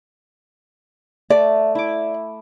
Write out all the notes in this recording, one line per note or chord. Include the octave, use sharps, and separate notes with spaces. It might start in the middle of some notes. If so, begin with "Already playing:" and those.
A3 D5
E4 D6